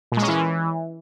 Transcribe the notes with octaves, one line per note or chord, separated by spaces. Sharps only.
A#2
G#3
C#4
E3